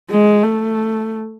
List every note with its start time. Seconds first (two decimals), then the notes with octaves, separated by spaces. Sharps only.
0.11 G#3
0.44 A3